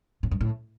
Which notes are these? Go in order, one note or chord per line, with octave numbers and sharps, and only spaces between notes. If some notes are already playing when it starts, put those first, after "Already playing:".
A2
G2
A2